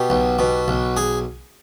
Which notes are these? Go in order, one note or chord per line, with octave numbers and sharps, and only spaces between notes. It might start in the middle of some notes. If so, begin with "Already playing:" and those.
Already playing: B2 G4
B1
B2
B1
G#4